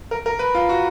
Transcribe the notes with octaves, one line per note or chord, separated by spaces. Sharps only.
A#4
A#4
B4
F4
F#4